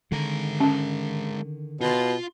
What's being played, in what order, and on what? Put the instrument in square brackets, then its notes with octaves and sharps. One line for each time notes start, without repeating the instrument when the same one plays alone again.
[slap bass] D3 D#3 [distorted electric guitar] G#3 A#4
[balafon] C#4
[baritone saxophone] B2 [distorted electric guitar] F4 C6